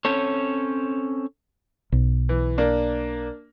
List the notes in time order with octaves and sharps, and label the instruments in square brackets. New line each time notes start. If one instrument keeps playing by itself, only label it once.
[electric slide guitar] C4 C#4 A4 C#5
[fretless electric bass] B1
[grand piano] E3
A#3 D4